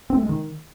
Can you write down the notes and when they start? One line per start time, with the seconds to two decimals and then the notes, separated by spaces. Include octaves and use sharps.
0.10 C4
0.16 A3
0.23 G#3
0.29 D#3